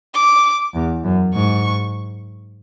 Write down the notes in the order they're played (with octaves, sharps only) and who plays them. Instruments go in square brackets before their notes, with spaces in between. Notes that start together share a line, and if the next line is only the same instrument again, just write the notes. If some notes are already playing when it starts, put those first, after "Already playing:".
[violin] D6
[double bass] E2
F#2
[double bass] G#2 [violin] C#6